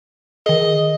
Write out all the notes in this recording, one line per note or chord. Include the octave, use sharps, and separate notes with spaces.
D#3 G#4 D#5